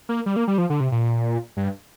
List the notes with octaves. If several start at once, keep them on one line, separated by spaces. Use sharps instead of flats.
A#3
G3
A#3
G3
F3
D3
C3
A#2
G2